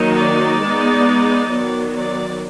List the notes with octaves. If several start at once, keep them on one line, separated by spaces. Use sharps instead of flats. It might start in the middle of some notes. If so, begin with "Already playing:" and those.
Already playing: D#3 F#3 A#3 D#4
D5
G#3 B3 D#4
D#3 F#3 B3
D5